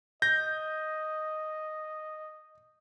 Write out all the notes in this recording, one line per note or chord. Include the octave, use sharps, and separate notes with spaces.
D#5 G6 A#6